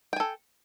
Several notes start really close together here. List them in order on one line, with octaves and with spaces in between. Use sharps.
G5 G#5 A4